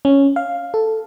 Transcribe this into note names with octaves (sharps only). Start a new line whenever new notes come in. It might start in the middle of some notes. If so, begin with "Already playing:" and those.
C#4
F5
A4